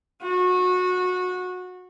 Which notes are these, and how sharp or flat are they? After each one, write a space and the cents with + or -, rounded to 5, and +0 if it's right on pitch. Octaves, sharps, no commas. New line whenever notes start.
F#4 -25